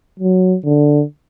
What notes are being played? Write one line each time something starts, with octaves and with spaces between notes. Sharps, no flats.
F#3
D3